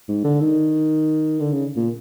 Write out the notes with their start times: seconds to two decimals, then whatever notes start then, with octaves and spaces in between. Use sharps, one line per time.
0.09 G#2
0.24 D3
0.41 D#3
1.40 D3
1.52 C#3
1.76 A#2